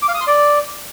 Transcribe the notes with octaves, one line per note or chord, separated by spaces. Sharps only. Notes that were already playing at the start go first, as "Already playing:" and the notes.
D6
F5
D#6
C6
D5